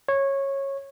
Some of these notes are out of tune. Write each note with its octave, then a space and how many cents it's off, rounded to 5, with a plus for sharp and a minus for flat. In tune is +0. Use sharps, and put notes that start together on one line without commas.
C#5 -15